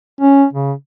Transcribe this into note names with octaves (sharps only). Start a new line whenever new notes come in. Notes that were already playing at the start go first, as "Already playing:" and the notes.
C#4
C#3